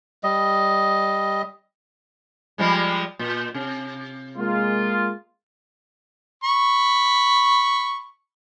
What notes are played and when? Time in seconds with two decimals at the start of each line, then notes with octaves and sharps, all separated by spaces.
0.24 G3 D#5
2.58 F3 G3 G#3
3.19 A#2
3.54 C3
4.37 G#3 A#3 F4
6.44 B5 C#6